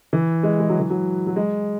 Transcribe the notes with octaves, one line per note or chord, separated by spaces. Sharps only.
E3
G#3
G#3
F#3
E3
F#3
F#3
G#3